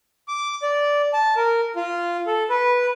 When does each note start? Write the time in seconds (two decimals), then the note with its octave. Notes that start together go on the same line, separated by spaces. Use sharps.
0.28 D6
0.62 D5
1.13 A5
1.36 A#4
1.76 F4
2.27 A4
2.50 B4